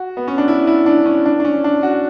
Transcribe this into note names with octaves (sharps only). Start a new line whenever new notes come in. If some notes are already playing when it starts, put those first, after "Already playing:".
Already playing: F#4
B3
C#4
D4
E4
E4
D4
C#4
D4
D4
C#4
D4
F#4